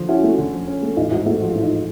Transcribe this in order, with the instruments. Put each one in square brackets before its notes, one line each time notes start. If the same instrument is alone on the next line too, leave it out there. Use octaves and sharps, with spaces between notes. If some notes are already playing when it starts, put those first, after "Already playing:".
Already playing: [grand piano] D3 F3
[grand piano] C#4 [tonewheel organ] E4 F#4
[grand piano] A3
D3
F3
C#4
A3
[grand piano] A1 [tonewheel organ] D#4 F4
[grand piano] G#2 [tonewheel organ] E4 F#4
[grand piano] A3 [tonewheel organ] E4 F#4
[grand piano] F3 [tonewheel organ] F#4
[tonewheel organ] F4
[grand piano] A1 [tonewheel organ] E4
[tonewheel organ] D#4 F4